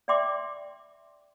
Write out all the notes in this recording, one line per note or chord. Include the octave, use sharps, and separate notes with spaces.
D5 E5 G5 C6 D6